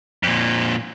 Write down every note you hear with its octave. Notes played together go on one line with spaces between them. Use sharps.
F2 A#2